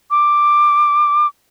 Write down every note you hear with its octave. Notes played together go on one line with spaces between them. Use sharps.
D6